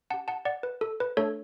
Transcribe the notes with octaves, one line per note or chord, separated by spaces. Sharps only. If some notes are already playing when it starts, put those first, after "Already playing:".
C#4 G4 F#5 A5
F#5 A5
D5 F#5
B4
A4
B4
A3 D4 A4 C#5